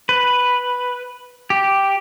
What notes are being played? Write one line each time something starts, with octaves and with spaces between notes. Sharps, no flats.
B4
G4